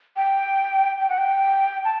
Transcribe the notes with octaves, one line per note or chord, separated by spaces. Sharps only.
G5
G5
F#5
G5
A5